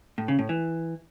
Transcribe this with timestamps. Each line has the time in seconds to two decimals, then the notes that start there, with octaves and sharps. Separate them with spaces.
0.18 A2
0.28 C#3
0.39 A2
0.49 E3